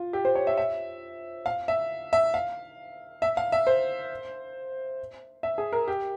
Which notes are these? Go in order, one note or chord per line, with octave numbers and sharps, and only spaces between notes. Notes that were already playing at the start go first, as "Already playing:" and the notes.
Already playing: F4
G4
C5
C#5
E5
E5
F5
E5
E5
F5
E5
F5
E5
C5
E5
G#4
A#4
G4